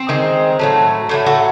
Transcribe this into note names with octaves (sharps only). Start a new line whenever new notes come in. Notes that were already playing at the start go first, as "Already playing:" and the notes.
Already playing: C4
D#3 G#3
A2 F#3 A3
A2 F#3 A3
F#4 A4